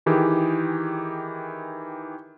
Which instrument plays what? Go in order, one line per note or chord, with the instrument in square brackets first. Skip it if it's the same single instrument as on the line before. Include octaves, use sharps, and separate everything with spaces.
[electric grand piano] D#3 E3 G4 G#4